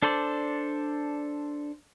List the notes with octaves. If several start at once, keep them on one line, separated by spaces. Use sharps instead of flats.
D4 A4 C5 D5